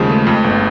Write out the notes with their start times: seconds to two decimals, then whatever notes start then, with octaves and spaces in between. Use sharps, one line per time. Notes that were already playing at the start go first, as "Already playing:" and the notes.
Already playing: D#2 C#3 F3 G#3
0.09 A3
0.27 F2
0.44 G1